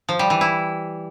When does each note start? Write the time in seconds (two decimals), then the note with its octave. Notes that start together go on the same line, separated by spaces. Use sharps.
0.09 F3
0.19 G3
0.30 E3
0.41 E4